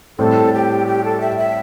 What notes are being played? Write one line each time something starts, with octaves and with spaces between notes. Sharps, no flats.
A2 G3 C4 A4
G4
G4
A4
E5
E5